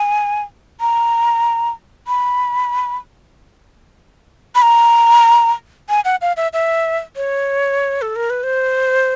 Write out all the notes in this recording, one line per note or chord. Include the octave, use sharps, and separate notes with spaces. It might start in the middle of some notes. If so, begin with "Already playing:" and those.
Already playing: G#5
A#5
B5
B5
A#5
G#5
F#5
F5
E5
E5
C#5
A4
A#4
B4
C5